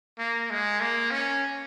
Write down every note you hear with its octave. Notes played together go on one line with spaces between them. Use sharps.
A#3
G#3
A#3
C#4